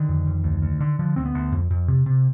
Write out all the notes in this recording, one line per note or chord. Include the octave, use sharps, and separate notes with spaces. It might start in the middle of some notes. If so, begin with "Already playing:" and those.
Already playing: D3 D#3
F2
F2
D2
D2
D3
D3 F3
D2 C4
B3
D2
F2
F2
C3
C3